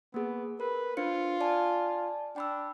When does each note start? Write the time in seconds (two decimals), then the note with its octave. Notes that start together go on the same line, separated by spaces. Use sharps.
0.14 A#3 B3 G#4
0.60 A#4 B4
0.97 D4 F4 C5 C#7
1.40 D5 G#5 A5
2.36 D4 G5 B5 E6